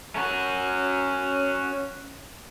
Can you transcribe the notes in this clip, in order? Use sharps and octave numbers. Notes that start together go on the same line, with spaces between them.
C#4 F#4